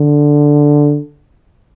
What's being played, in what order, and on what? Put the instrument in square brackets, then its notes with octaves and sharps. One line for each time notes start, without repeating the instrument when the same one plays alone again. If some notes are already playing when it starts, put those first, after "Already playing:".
Already playing: [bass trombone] D3